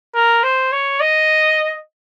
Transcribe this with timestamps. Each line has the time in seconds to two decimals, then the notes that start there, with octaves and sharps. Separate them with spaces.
0.15 A#4
0.43 C5
0.72 C#5
1.00 D#5